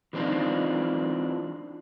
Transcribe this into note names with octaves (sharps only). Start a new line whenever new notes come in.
E3 G3 C4 D4 D#4 F4